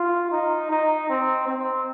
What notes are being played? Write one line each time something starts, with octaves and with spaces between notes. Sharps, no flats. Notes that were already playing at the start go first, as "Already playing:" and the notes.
Already playing: F4
D#4
D#4
C4
C4